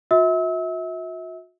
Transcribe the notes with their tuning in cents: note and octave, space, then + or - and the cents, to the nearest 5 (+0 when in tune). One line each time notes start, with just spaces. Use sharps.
F#4 -45 E5 -35 E6 -35